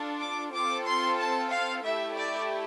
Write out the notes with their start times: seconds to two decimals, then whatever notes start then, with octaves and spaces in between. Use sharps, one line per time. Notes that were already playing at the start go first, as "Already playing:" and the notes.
Already playing: D4 F4 A4
0.20 D6
0.53 C4 F4 A4 D6
0.86 C6
1.19 A5
1.51 F5
1.83 A3 E4 G4 E5
2.17 D5